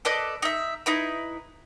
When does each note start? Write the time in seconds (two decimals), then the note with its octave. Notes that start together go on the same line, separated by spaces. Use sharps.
0.05 A4 B4 D5 D#5
0.42 D#4 E5
0.86 D#4 E4 B4